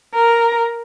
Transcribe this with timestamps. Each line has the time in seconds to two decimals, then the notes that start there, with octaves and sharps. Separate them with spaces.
0.15 A#4